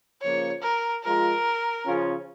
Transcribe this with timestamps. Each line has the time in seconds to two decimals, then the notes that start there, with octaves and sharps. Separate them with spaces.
0.22 C#3 F3 A#3 F4 C#5
0.63 A#4
1.04 F3 G#3 F4 A#4
1.86 C#3 F3 C#4 F4